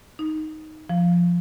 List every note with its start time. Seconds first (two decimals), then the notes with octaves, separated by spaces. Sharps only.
0.19 D#4
0.89 F3